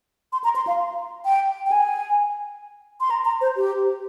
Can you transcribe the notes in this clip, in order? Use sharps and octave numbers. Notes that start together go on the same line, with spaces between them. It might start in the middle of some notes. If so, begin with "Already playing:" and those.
C6
A#5
C6
F5
G5
G5
G#5
C6
A#5
A#5
C5
G4